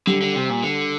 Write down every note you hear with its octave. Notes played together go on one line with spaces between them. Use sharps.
D3 G3
D3
C3
A#2
D3